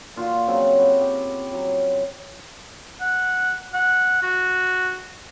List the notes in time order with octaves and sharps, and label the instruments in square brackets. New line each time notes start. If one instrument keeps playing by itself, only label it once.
[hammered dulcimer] A#2 F4 F#4 C6
C#3 F#3 C4
E4 F#4 G4
G4
F#3
[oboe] F#5
F#5
F#4